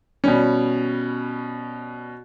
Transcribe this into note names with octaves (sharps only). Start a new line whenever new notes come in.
B2 G3 C#4